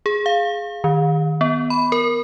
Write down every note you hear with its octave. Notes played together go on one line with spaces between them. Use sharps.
G#4
F5
D#3
B3
B5
A#4